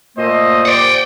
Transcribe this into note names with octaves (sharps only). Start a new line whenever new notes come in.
A#2 A3 A#3 C5 D#5
G4 C5 D5 F#5 G5